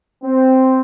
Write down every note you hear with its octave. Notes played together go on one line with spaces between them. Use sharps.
C4